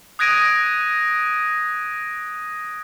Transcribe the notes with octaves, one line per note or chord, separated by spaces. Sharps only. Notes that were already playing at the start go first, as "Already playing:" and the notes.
D#6 F#6 G#6 A#6 D7 D#7